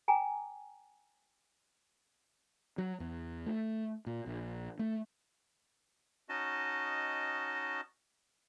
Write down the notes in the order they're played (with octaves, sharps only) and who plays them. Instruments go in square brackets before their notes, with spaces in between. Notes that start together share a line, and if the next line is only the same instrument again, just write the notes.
[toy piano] G5 G#5 A#5 D6
[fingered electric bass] F#3
E2
A3
A#2
A#1
A3
[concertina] C#4 D#4 F#4 D#5 A5